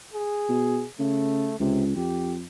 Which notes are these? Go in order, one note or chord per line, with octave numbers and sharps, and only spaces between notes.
G#4
B2
C#3 A3
C#2 C3
F2 G4